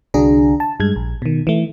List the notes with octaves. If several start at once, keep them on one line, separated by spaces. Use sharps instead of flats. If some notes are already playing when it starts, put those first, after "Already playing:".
C2 D3 D4 F#4 G#4 A#5
A5
G2 G#3 G#6
A#1
B2 D#3
E3 A3